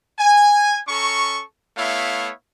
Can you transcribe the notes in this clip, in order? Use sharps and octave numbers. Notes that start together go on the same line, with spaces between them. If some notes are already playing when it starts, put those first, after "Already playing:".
G#5
C#4 A4 A#5 C#6
A3 B3 E4 C#5 E5 F5